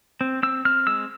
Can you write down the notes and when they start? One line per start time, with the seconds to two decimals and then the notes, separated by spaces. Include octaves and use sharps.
0.21 C4
0.43 C4 E6
0.65 C4 F6
0.87 G#3 E6